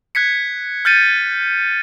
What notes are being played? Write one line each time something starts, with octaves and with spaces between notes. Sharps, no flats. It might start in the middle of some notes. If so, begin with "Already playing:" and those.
F#6 G#6 B6 C#7
F6 G6 A6 C#7 D#7